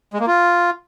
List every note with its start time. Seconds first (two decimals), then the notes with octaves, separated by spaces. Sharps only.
0.13 G#3
0.20 A#3
0.27 F4